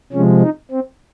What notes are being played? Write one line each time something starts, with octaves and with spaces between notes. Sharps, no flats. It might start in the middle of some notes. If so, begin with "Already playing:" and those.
C3 F3 G#3 C#4
D#4
C4